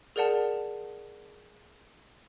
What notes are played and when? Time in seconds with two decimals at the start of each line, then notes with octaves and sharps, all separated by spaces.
0.16 G#4 A#4 D5 F#5 A5